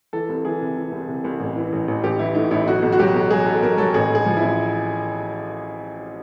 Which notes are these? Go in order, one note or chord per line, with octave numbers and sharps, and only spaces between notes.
E3 A4
C2
E3 G#4
C3
E3
C2
C3
C2
A1
E3
A1
A1
A1 G4
E3 E4
A2 D#4
A1 E4
B1 F#4
B1
F#4
F#3 G4
B1
F#3 G#4
B1 A4
B1 A#4
F#3 A4
A1 G#4
A1
G#4
F3
E4
A1